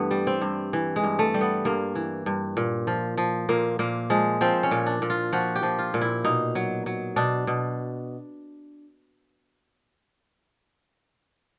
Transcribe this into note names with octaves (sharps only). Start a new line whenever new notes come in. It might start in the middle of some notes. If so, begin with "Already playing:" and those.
Already playing: G2 E3 A3 B3
G3
C4
G2
E3
G#3
G2
A3
G3
B3
G2 A#3
E3
G2
A#2
F3
F3
A#2 A#3
A#2 A#3
F3 G#3
F3 C4
C#4
A#2
D4
A#2
F4
F3 F#4
G4
F3
F4
A#2
E4
B2 D#4
F#3
F#3
B2 D4
B2